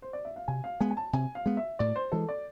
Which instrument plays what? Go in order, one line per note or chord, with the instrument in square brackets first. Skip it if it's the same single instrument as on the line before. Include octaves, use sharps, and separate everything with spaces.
[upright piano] C5
D5
E5
F5
[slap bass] C3 [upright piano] G#5
[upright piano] F5
[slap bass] G#3 B3 [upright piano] G#5
[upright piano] G#5
A5
[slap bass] C3 [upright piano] G#5
[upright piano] F5
[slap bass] G#3 B3
[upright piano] E5
[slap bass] A2 [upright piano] D5
[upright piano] C5
[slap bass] E3 G#3 [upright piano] A4
[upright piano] D5